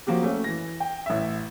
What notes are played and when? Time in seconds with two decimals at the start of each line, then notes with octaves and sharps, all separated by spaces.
0.07 F3 F#3 A#3 F#4 G4
0.23 A3 C#4
0.44 E3 A#6
0.80 G5
1.06 A1 E5